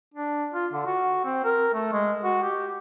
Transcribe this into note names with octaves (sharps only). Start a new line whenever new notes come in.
D4
F4
D3
F#4
C4
A#4
A3
G#3
F#4
G4